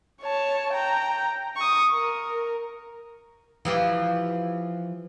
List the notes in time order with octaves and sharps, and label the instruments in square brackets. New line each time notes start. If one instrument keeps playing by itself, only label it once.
[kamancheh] C#5 A5
G5 A#5
C#6 D#6
A#4
[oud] E3 F3 G4